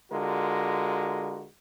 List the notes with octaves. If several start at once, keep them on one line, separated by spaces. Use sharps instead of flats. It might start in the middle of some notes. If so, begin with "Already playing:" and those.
D3 G#3 F4 F#4 A#4